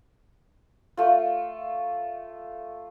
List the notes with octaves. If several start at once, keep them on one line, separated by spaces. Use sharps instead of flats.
A3 F4